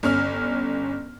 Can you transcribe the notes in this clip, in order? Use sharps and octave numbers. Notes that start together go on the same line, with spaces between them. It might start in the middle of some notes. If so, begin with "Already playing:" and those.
G1 C#4 F6